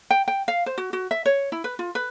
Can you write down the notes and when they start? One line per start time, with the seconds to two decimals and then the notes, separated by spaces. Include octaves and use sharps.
0.11 G5
0.28 G5
0.48 F5
0.66 C5
0.78 F#4
0.93 F#4
1.11 E5
1.26 C#5
1.52 E4
1.64 B4
1.79 F4
1.95 B4